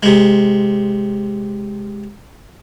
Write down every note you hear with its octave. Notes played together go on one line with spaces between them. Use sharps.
C3 G#3